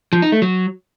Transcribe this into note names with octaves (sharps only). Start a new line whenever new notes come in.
F3
D#4
A3
F#3